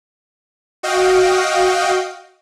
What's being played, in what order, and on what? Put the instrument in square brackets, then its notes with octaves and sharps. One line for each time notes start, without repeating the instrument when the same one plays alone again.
[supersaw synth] F#4 D#5 F5 G5